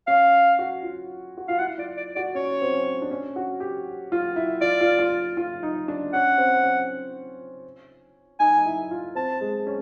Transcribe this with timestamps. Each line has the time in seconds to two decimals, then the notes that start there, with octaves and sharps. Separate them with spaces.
0.07 C#4 F5
0.59 F#4
0.83 F4
1.38 F#4
1.48 F4 F5
1.59 E4 F#5
1.78 F4 D5
1.97 D5
2.15 F#4 D5
2.35 C#4 C#5
2.62 C4
2.73 C#4
3.02 D4
3.11 C#4
3.36 F#4
3.60 G4
4.12 F4
4.36 E4
4.61 F4 D5
4.81 F4
4.99 F4
5.37 F4
5.63 D#4
5.88 D4
6.13 C#4 F#5
6.38 C4
6.63 C#4
8.40 D#4 G#5
8.57 D#4
8.66 E4
8.91 F4
9.15 C4 A5
9.41 G#3
9.67 C#4